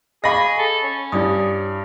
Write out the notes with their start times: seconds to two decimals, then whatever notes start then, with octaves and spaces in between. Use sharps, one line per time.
0.24 G#4 D#5 F5 B5 C#6 D6 A#6
0.58 A4
0.84 C#4
1.12 G2 E4 D5 D#6